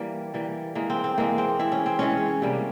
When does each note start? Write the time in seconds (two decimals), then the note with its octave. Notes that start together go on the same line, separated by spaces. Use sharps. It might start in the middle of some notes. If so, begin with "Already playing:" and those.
Already playing: E3 G3 A#3
0.34 E3 G3 A#3
0.75 E3 G#3 A#3
0.90 C4
1.04 C4
1.18 E3 G#3 A#3
1.38 C4
1.59 E3 G#3 E4
1.72 C#4
1.86 C4
1.99 E3 G#3 C#4
2.42 C3 G3 A#3